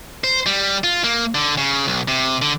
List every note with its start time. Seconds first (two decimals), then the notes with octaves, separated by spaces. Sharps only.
0.24 C5
0.46 G3
0.84 F4
1.04 A#3
1.35 D3
1.58 C#3
1.87 B1
2.08 C3
2.42 D3